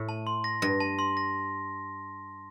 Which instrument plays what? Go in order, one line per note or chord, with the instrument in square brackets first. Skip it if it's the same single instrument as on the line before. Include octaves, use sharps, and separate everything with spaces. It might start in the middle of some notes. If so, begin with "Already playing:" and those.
Already playing: [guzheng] A2
[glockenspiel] A5
C6
A#6
[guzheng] G2 [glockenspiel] A#6
[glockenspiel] A5
C6
A#6